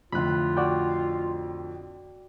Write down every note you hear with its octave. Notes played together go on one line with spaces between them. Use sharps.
F2 A2 D3 F4 B5 F#6
F#4 D5 G5